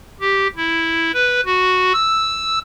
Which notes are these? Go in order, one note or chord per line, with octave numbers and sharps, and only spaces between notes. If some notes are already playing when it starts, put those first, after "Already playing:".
G4
E4
B4
F#4
E6